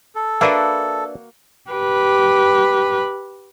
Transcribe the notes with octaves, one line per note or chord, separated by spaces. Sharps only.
A4
A#3 D4 F#4 A#4 B4 E5
G4 B4